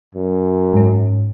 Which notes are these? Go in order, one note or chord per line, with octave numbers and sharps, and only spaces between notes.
F#2
G#2 C#4